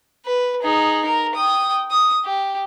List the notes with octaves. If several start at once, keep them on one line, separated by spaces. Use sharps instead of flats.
B4
D#4 G#4
A#4
G5 D#6
D#6
G4